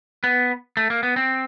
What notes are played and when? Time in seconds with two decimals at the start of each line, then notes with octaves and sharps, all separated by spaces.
0.24 B3
0.77 A3
0.90 A#3
1.03 B3
1.16 C4